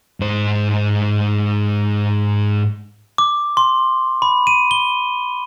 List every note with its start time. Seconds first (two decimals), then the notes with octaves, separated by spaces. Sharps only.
0.20 G#2 C5
3.18 D6
3.57 C6
4.22 B5
4.47 D#7
4.71 G7